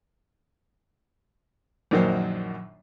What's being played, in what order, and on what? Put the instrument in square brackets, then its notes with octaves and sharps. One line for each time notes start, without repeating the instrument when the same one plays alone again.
[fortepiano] A#1 F#2 D#3 F#3 A#3 C5